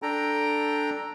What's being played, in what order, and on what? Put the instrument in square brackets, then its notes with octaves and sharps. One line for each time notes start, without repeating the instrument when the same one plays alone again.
[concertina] D4 A4 G5 A#5